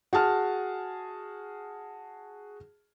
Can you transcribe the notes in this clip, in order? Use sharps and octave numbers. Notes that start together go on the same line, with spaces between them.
F#4 G#4 A5 F6